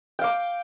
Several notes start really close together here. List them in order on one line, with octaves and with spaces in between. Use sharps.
G5 F5 D6